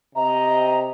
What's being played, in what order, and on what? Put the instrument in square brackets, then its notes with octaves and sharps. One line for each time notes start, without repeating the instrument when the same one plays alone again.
[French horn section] C3 D#5 [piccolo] A#5